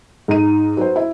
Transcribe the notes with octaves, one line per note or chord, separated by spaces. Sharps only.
G#2 D#4 D#5 D#7
F#3 B4 C5
E4